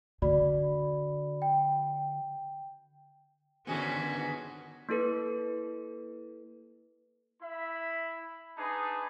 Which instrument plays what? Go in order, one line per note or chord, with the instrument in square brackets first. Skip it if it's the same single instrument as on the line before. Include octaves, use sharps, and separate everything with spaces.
[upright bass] D3 [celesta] F#4 D5 B5
[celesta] G5
[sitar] G#2 D#3 C#4 [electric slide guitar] D3 B3 [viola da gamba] F#4 B4 [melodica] G#4
[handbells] A#3 E4 A4 B4
[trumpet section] E4 E5 B5
D4 D#4 G#4 B4 A5 B5